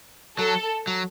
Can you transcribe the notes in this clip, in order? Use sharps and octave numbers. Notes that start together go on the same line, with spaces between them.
F#3 A4
F#3